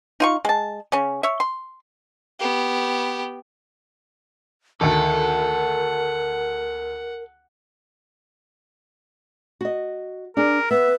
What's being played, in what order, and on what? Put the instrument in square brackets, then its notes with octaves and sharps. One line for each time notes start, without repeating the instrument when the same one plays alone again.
[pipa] D#4 F4 C#6
G#3 A5
C#3 C#4
C#5 E5
C6
[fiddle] B3 G4
[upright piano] D2 D#3 [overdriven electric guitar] A4 [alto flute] A#4 [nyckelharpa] F#5
[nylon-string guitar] F#4 D#5
[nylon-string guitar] D4 G#4 [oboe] A#4
[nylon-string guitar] B3 [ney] B4 [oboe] E5